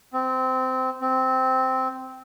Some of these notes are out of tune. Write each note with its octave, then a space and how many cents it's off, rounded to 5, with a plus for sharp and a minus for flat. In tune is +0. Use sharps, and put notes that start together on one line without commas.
C4 -15
C4 -10